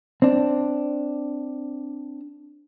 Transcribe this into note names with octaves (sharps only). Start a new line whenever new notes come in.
C4 D4